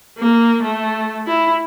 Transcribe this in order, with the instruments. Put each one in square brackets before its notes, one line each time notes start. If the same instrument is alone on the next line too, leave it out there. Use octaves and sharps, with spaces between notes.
[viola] A#3
A3
E4